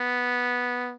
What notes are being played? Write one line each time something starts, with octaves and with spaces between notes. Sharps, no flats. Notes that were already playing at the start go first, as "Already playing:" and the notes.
Already playing: B3